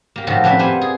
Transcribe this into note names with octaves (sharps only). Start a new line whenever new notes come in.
A#3 G4
A2 D#3 F3 F#4 G4 A4
F2 C#4 G4 B4 D5 E5
A#3 G4 B4 C5 F#5 G#5
G#4